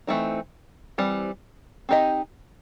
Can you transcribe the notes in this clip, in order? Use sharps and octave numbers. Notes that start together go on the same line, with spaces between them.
E3 A3 C4 D#4
E3 G3 C4
C4 D#4 G4 D#5